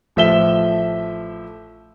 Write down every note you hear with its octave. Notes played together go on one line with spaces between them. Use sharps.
A1 F3 A3 E5 E7 G7